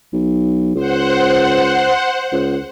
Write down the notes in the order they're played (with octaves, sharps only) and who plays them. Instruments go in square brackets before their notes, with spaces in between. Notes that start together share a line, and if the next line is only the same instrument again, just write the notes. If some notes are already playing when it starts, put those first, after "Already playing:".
[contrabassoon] B1
[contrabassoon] C#2 [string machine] C5 F#5
[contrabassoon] C#2